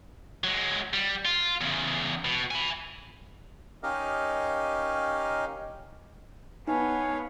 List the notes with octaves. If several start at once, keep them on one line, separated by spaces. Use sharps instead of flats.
F#3 G#3
G3
F4
E2 C#3
B2
G#5 B5
C#4 D#4 G4 A#4 D#5 F5
B3 D#4 C#5 F5 G#5